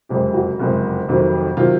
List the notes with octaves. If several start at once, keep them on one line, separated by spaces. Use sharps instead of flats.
F#1 F2 C3 F3 G#3 G4
F#4
F#1 F2 C3 F3 G#3
F1 F2 C3 D#3 F#3
C3 D#3 F#3 F4